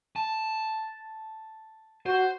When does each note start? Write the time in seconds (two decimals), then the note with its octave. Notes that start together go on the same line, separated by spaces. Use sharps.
0.16 A5
2.06 F#4 C5